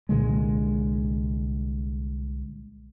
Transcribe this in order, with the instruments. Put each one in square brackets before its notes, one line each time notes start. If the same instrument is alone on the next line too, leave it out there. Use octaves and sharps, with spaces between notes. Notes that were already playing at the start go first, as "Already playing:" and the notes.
[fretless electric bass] C2 A#2 D3 G#3